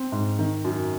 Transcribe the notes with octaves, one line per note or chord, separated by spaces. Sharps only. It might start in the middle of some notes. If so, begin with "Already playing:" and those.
Already playing: C4
G#2
D#3
F#2